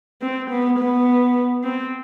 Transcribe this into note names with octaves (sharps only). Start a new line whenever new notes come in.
C4
B3
B3
C4